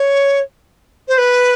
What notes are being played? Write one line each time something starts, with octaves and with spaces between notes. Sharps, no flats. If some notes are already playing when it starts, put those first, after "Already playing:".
Already playing: C#5
C5
B4